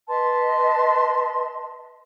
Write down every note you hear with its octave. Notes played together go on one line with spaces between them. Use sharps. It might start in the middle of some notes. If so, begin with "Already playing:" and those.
B4 D#5 A5 C6